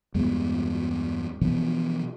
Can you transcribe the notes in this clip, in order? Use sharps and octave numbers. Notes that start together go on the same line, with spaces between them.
E2 G2 G#3 B3
B2 E3 F3 B3